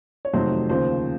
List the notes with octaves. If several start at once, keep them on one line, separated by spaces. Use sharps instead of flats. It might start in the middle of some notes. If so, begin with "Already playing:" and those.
C#5
F2 C3 D#3 F#3 A3 C5
D#2 C#3 F3 C5